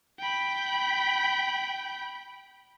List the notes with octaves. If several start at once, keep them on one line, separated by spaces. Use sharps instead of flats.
G5 B5